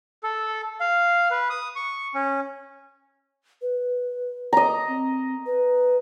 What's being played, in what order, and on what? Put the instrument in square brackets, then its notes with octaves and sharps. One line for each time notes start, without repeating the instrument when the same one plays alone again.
[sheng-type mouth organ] A4
F5
B4
D#6
C#6
C#4
[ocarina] B4
[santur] D#5 A#5
[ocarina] C4
B4